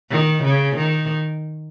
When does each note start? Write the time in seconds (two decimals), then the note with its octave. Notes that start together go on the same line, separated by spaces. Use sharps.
0.11 D#3
0.43 C#3
0.76 D#3